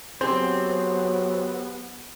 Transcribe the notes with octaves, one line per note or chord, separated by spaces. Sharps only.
F#3 B3 C4 G4 G#4 C5